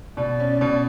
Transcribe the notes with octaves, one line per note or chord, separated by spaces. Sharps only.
B2 D5
C#4
B2